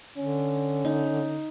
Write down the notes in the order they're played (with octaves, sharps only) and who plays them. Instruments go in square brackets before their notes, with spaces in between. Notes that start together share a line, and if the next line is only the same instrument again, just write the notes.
[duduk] D3 [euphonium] C#4
[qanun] D#4